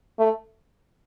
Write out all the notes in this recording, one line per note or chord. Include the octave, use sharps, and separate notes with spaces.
A3